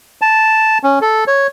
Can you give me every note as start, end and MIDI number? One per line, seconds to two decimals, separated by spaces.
0.22 0.78 81
0.84 0.99 61
1.01 1.24 69
1.27 1.47 73